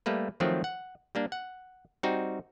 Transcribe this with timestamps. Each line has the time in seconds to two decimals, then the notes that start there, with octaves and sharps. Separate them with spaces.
0.06 G3 A3 A#3 B4
0.40 D#3 F3 F#3 A3 C4
0.64 F#5
1.15 G3 A#3 D4
1.32 F#5
2.03 G3 C4 D#4 F#4